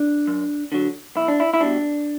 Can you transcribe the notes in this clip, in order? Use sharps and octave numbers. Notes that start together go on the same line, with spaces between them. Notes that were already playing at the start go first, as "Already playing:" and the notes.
Already playing: D4
F#2
D3 F#3
B1 E4
D4
E4
E4
B2 G3 D4